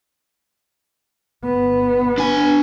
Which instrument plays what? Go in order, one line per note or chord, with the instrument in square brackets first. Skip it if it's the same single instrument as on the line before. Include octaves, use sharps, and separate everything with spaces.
[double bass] G1 B3
[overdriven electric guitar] D4 G#5